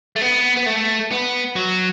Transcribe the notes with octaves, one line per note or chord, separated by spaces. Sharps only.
A3
B3
B3
A3
B3
F#3